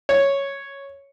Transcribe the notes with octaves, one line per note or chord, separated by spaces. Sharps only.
C#5